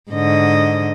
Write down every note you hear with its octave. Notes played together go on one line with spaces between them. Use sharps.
G#2 D3 D#5